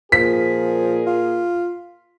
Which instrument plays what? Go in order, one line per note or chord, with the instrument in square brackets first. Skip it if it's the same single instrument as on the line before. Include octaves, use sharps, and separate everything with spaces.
[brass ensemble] A#2 G#4 A#4 [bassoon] F3 [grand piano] B6
[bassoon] F4